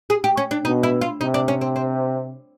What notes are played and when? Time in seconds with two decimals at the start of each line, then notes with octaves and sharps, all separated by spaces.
0.10 G#4
0.24 G4
0.37 C#4
0.51 D4
0.65 B2 D#4
0.83 E4
1.01 F4
1.20 C3 D#4
1.34 D4
1.48 C#4
1.61 C4
1.76 C4